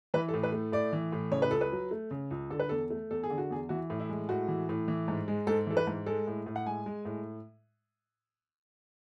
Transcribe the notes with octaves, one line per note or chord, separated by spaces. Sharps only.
E3 B4
A4
A2
B4
A3
A2 D5
E3
A2
C#3 C#5
B4
C#2 A4
B4
F#3
A3
C#3
C#2
D3 A4
B4
E2 A4
A3
E2 A4
G#4
D3
F#4
E2 G#4
E3 F#4
A2
E4
G#3
A2 F#4
E3
A2
E3
G#2
G#3
G#2 A4
E3 A4
B4
G#2
G#3 A4
A2
A2
F#5
G#3 G#5
G#3
A2